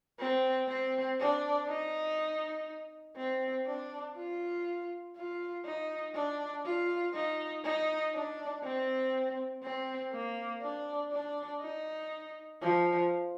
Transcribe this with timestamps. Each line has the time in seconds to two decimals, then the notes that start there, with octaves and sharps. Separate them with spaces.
0.19 C4
0.68 C4
1.19 D4
1.68 D#4
3.17 C4
3.67 D4
4.16 F4
5.17 F4
5.65 D#4
6.15 D4
6.65 F4
7.14 D#4
7.64 D#4
8.15 D4
8.63 C4
9.63 C4
10.12 A#3
10.62 D4
11.12 D4
11.61 D#4
12.62 F3